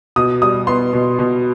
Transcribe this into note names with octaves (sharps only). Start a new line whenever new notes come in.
B2 D#6
G3 D#6
B3 C6
B2
B2